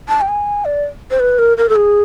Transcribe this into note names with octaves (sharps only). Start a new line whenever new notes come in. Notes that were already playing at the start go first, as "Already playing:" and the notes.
A5
G5
G#5
D5
C5
B4
A#4
A#4
A4
G#4